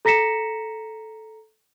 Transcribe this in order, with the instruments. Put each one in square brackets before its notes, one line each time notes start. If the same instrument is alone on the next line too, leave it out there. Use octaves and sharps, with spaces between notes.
[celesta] A4 A#5 A#6 B6 C#7 E7